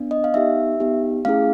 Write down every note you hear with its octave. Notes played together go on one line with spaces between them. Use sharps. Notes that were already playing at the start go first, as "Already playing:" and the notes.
Already playing: B3 D4
D#5
F5
B3 D#4 G4 E5
B3 D#4 G4
A3 C#4 E4 G#4 F5